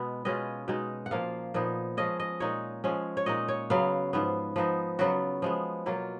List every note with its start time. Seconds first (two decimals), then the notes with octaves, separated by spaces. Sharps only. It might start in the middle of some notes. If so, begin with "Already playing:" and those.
Already playing: B2 G#3 B3
0.25 B2 G#3 C#4 F4 D#5
0.68 B2 G#3 D#4
1.06 F#5
1.11 A#2 F3 A#3 F4 F5
1.54 A#2 F3 B3 D#4
1.97 F3 G#3 C#4 D#5
2.20 D#5
2.40 A#2 G#3 D#4 C#5
2.84 F3 G#3 C#4
3.17 C#5
3.26 A#2 G#3 D#4 D#5
3.48 C#5
3.70 C#3 F#3 B3 F5
4.13 G#2 F3 B3
4.56 F3 B3 D#4
4.99 C#3 F#3 B3 F4 F#4
5.42 F3 G#3 B3
5.86 B2 F#3 A#3 F4